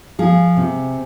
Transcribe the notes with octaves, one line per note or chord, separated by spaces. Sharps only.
F3 G#4
C3